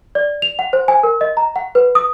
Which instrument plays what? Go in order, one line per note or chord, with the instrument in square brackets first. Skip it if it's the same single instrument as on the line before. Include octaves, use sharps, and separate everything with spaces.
[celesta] D5
F7
F#5
C5
G#5
A#4
D#5
A#5
F#5
B4
D#6